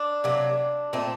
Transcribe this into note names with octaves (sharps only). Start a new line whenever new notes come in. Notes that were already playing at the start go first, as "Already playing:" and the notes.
Already playing: D4
C3 F#3 A#3
A#2 A3 C4